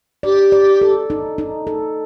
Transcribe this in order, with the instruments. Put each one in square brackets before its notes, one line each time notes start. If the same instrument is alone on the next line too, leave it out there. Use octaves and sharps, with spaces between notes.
[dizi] G4 [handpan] D5
[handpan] D5
A4
D#4
D#4
A4